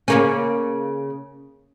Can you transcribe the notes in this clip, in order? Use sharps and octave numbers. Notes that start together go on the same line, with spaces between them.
C#3 A#3 C#4